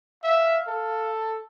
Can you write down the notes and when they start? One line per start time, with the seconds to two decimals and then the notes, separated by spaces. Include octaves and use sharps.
0.24 E5 F5
0.68 A4